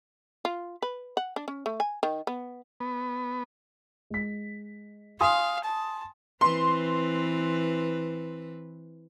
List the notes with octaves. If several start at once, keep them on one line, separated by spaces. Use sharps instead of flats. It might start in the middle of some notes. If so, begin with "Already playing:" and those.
F4
B4
F#5
D4
C#4
A3
G#5
D#3
B3
B3
G#3 B6
F5 G#5 C6 D#6
A5
E3 C4 B4 C6